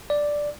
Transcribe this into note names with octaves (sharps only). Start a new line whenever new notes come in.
D5